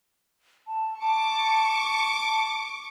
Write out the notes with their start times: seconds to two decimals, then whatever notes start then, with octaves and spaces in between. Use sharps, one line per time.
0.67 A5
1.00 A5 C#6 D6